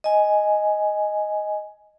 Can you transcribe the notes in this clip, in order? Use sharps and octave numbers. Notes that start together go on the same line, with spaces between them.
D#5 G#5